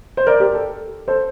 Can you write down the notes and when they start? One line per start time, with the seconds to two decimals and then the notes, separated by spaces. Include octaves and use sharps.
0.17 C5
0.27 A#4 D5
0.40 G4 A#4
0.54 A4
1.08 A4 C5